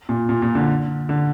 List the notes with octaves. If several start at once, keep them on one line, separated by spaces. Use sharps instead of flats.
A#2
A#2
A#2
D3
D3